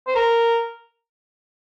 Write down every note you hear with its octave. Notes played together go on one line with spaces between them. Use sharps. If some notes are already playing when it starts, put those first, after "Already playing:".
C5
A#4